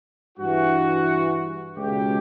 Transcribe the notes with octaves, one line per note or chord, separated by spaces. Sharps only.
G2 E3 F#4
C#2 B2 G4